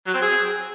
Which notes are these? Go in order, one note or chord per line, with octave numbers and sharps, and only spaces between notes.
F#3
C4
G#4